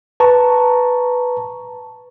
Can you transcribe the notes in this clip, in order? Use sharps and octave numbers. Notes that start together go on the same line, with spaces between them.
B4 A5 A#5 C#6